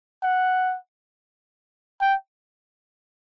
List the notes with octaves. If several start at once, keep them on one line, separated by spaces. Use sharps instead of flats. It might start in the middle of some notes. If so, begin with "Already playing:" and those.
F#5
G5